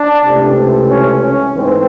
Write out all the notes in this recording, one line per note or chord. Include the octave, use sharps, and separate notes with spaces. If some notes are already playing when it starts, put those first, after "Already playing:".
Already playing: D4
C#2 C3 E3 A3 C4
C#4
C#4
G#2 E3 A3 C4